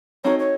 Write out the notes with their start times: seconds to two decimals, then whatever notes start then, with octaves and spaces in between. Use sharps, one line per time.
0.24 C4 D#4 F#4 A4 C#5
0.39 C#5